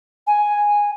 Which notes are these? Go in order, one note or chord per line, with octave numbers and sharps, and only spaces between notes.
G#5